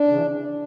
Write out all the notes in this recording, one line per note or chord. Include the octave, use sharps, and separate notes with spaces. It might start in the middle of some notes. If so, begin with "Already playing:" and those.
Already playing: D4
C#3 E3